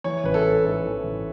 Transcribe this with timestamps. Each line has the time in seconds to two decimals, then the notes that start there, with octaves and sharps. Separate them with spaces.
0.04 E3 C#5
0.24 A1 B4
0.34 A4
0.44 A1
0.64 G#2 A4
0.84 E3
1.04 A1